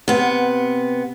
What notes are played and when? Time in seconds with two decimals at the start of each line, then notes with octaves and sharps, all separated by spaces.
0.08 C3 B3